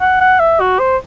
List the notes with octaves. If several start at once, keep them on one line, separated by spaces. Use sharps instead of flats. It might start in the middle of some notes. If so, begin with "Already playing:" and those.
F#5
F#5
E5
F#4
C5